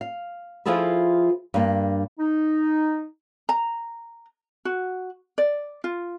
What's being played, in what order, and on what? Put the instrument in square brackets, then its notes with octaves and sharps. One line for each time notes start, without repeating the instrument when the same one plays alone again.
[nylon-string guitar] F5
F3 E4 F4 G#4 A4 B4
G2 A#3 D4
[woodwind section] D#4
[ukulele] A#5
F#4
D5
F4